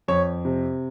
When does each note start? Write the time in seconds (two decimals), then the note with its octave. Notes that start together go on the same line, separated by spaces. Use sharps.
0.08 F2 C#5
0.45 C3